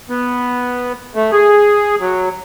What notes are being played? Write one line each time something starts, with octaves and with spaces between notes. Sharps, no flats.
B3
A3
G#4
F#3